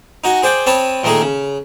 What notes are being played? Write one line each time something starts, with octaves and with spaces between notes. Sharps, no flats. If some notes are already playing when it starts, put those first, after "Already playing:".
D#4 F#4 G#5
G#4 C5 D5 G5
C4 C#5 A5 B5 D#6
A#2 D#3 A3 D#4 G#4
C#3